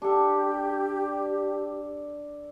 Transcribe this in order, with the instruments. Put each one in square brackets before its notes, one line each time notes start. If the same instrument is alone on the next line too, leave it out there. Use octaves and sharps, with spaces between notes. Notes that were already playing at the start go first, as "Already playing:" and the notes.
[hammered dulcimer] D4 A4 [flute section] G4